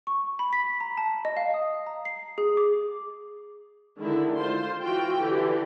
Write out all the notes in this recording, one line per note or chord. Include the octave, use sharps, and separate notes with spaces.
C#6
B5
B6
A#5
A5
D#5
F5
D#6
A#5
C7
G#4
D6
D3 D#3 G#3 E4
F4 C5 C6
E3 F4 F#4 G5
D3 E3 G4